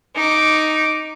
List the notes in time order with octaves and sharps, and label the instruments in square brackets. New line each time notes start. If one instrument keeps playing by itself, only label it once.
[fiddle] D#4 D6